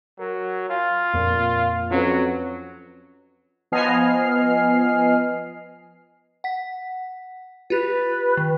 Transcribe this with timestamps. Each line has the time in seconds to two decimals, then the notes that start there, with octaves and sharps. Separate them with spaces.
0.19 F#3 A#4
0.69 F4 G#5
1.13 F2 A#2
1.91 F2 F#3 C#4 B4
3.72 F3 B3 D#5 G#5 F6 C7
6.44 F#5 B6
7.70 F4 G4 B4 A6
8.37 D#3